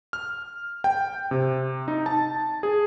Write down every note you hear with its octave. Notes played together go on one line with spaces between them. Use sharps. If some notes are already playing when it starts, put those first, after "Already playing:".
F6
G5
C3
D#4
A5
G#4